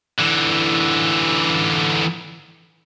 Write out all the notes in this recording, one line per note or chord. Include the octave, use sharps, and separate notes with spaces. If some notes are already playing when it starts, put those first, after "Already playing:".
D3 E3